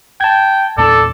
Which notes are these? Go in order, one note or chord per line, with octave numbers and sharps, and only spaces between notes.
G5 A5 G#6
E2 A#2 A#3 A4 D5